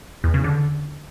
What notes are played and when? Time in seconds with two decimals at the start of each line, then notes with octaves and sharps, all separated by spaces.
0.24 E2
0.34 C#3
0.44 D3